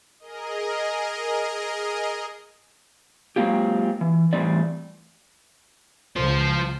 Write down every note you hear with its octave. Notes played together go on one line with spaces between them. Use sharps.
G#4 A#4 D#5
F#3 G#3 A#3 C4 F4 G4
E3
A2 E3 G3 A3 C4 D5
C#2 F3 C5